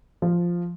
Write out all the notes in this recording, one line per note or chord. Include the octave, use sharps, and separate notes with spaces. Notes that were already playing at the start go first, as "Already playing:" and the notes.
F3